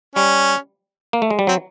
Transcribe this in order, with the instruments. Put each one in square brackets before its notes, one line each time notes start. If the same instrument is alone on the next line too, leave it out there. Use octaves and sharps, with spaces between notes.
[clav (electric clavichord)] G3 [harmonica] C#4
[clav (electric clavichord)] A#3
A3
G#3
G3
[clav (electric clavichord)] F#3 [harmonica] C4